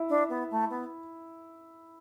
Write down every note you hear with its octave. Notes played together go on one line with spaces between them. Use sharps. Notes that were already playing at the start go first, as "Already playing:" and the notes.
Already playing: E4
D4
B3
A3
B3